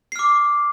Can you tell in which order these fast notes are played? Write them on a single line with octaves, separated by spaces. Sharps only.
C7 F6 D6